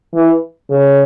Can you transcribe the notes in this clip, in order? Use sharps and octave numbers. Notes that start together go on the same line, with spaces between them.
E3
C#3